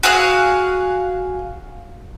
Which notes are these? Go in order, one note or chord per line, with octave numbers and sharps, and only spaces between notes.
F#4 G#4 F5 F#6